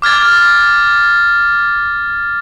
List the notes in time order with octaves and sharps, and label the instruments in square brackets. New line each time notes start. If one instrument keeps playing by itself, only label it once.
[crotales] D6 F6 G#6 A6